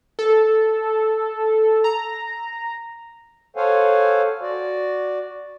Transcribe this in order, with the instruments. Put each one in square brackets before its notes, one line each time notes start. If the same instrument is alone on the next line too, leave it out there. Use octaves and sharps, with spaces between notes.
[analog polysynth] A4
A#5
[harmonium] A4 C5 C#5 F5 F#5 G#5
F#4 D5